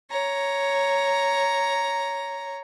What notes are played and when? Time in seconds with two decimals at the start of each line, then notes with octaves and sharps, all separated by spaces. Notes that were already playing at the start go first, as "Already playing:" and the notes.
0.10 C#5 A#5